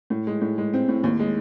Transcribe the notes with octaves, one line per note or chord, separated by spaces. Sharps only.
A2
G#3
A2
G#3
C4
A2
D#2
G#3